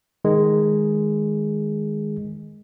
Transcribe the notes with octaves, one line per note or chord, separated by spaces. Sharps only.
D#3 G#3